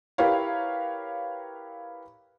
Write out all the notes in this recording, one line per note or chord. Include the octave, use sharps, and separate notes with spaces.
E4 G4 A#4 B4 C#5 F5